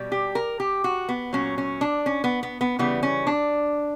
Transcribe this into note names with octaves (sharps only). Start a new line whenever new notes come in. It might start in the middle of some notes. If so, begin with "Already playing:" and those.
Already playing: B2 G3
G4
A#4
G4
F#4
B3
A#2 F#3 C#4
C#4
D4
C#4
B3
B3
B3
C#3 E3 G3 B3
C#4
D4